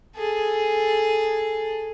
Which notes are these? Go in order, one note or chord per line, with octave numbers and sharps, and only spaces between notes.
G#4 A4